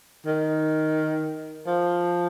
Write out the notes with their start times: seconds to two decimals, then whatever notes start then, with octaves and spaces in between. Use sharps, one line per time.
0.26 D#3
1.67 F3